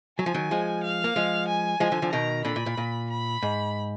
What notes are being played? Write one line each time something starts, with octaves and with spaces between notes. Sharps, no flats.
F#3 G#5
F3
D#3 F#3
F3 G#3
F5
A#3
F3 G#3
G#5
F3 G#3
D3 F3
D3 F3
B2 D#3 A#5
A#2 D3 B5
A#2
A#2
A#2
B5
G#2